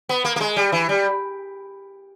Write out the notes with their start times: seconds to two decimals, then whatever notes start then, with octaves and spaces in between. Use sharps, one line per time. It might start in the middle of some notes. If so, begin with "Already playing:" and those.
0.09 B3
0.25 A#3
0.36 A#3
0.41 G#3
0.56 G3
0.72 E3
0.89 G3